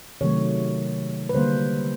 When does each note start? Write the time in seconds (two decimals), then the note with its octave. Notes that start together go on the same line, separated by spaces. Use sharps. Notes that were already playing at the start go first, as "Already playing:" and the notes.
0.21 C3 D#3 F#3 A3 C#5
1.29 B4
1.34 D3 G3 A#3 C5